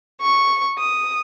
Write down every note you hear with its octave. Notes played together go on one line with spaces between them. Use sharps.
C#6
D#6